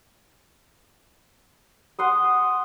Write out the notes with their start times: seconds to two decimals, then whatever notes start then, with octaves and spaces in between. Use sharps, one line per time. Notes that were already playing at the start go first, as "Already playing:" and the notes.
1.99 F#5 C6 D#6